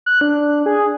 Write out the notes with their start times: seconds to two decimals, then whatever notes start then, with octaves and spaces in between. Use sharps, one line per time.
0.06 F#6
0.21 D4
0.66 G#4